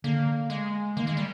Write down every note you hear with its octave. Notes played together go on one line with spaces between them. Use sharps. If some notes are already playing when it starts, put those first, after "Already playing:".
D3 A#3
G#3
D#3 A#3
G#3
G3